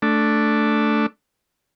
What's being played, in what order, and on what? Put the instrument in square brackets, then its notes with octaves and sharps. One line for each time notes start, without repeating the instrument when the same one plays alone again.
[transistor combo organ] A3 D4